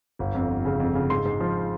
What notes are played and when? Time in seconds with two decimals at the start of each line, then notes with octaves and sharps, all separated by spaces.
0.19 G1
0.35 F2
0.50 G1
0.65 C#3
0.80 F2
0.95 C#3
1.10 G#2 C6
1.25 G#2
1.40 F3